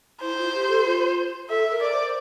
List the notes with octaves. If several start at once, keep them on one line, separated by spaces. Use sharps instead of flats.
E4 C5
F4
G4
A4
F4
A4 E5
A#4
D5
C5